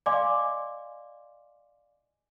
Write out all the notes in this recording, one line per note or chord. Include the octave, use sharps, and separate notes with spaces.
D5 D#5 F5 G#5 C6 D6